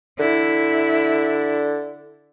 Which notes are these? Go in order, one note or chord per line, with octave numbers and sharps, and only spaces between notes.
D3 E4